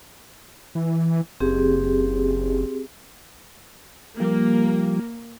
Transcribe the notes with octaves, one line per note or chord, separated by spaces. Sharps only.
E3
F#1 C4 G4 G#4
F3 G3 A#3